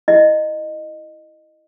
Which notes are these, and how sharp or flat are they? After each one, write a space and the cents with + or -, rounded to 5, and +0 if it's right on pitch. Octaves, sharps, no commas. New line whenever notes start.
E4 +0 D#5 -15